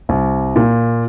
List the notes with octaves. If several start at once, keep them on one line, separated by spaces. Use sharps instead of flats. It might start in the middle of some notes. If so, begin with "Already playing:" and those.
C2
A#2